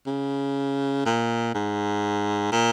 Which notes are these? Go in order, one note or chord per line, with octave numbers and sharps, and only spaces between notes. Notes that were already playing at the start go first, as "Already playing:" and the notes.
C#3
A#2
G#2
A#2